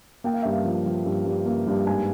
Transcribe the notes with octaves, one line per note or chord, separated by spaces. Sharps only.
A#3 G5
F5
G2 E5
F5
F3
F3
G2
G2
A#3
G2
G#2 G#5